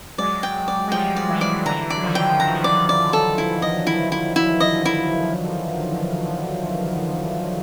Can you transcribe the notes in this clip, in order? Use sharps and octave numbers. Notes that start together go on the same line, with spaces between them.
F#3 G#3 D5
G5
D5
G#3
F3 G3 G5
D5
E3 F#3
D5
D3 E3 A#5
D5
F#3
D#3 F3
G5
E3 A#5
D#3
D3
D#3 D5
D5
A4
E4
D#5
E4
E4
E4
D#5
E4